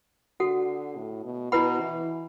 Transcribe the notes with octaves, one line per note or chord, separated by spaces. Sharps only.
D3 F#4 A4 F#5
A2
B2
B2 E4 B4 F#5 B5
E3